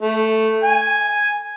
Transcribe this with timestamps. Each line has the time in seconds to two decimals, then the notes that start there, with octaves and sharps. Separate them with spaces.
0.02 A3
0.64 G#5